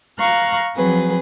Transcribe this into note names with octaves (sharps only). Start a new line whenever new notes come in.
F5 A#5 C#6 F6 F#6
F3 F#3 C4 F#4 G#4 B4